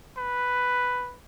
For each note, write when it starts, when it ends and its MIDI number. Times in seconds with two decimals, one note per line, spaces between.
0.18 1.15 71